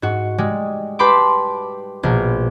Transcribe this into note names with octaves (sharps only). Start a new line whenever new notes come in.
G#2 F#4
G3 G#3
G4 B4 A5 B5 C6 D6
A#1 B2 A#4